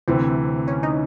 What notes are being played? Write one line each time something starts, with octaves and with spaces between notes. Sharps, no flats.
D2 C3 E3 C4
C#4
D#4